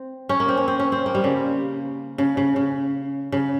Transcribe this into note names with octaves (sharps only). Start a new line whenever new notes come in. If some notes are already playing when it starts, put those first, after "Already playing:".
Already playing: C4
C#4
A#3
C4
C#4
C4
C#4
C4
A#3
G3
C#3
C#3
C#3
C#3
C#3